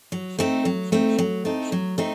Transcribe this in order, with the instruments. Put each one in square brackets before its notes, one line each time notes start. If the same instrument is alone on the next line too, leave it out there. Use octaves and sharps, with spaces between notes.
[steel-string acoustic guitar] F#3
A3 C4 D#4
F#3
A3 C4 D#4
F#3
A3 C4 D#4
F#3
A3 C4 D#4